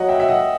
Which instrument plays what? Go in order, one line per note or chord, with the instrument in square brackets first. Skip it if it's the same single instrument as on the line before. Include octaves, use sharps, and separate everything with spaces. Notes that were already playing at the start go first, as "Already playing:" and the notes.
Already playing: [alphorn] F#3 [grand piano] D#5 F#5
[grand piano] E5 G5
E5
D#5 F#5